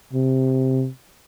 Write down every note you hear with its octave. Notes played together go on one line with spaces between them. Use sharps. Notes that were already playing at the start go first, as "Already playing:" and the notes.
C3